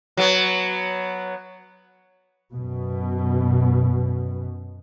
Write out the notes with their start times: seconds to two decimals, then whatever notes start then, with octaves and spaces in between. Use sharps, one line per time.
0.17 F#3 B3
2.53 F#2 B2